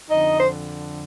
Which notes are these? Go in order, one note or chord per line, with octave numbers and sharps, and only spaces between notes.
F2 D3 D#4 D#5
C5